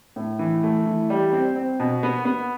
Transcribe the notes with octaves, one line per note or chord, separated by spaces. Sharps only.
A2
E3
A3
E3
G3
C4
C4
B2
B3
B3